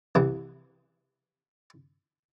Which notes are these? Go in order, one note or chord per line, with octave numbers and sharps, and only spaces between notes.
C2 E3